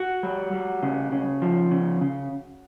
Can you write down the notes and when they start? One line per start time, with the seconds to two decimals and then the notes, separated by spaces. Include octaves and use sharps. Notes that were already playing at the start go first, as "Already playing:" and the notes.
Already playing: F#4
0.23 G3
0.53 G3
0.83 C#3
1.12 C#3
1.42 F3
1.71 C#3
2.01 C#3